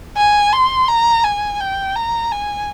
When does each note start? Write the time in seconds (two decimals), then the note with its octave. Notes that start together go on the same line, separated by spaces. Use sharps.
0.17 G#5
0.53 C6
0.88 A#5
1.24 G#5
1.61 G5
1.96 A#5
2.31 G#5